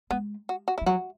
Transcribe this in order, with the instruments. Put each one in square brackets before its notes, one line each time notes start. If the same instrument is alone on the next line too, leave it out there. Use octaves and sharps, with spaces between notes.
[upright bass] G#3 [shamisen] B3
[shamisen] F#4
F#4
E4
[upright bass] E3
[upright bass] F#3 [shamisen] F#4